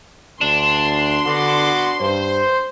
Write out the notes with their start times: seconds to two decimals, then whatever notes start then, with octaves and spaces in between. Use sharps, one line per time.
0.41 D2 D4 C6
1.26 D3 B3 F#4 D6
2.01 G2 C5